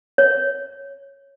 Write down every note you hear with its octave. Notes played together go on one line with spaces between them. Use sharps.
C#5